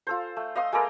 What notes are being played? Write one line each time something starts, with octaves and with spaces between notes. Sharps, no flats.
F4 A4 C5
A3
D#5 F5 C6 D#6
G#3 A#3 A4 A#4